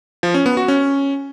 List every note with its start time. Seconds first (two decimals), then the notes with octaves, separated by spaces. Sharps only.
0.23 F3
0.34 C#4
0.46 B3
0.57 F#4
0.68 C#4